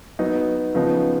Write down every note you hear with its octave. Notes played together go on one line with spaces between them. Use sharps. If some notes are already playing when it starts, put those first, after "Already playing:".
F#3 B3 D#4
C#3 F3 B3 D#4